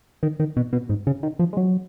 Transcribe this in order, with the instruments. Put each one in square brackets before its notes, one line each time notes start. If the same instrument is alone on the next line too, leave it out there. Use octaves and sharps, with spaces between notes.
[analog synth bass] D#3
D#3
B2
B2
G#2
C#3
D#3
F3
G#3
F#3